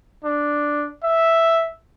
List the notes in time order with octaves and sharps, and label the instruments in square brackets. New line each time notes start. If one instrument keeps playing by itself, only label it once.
[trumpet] D4
E5